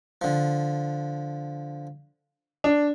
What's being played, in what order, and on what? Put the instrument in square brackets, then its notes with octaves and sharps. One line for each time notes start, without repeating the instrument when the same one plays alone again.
[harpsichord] D3 F3
[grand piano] D4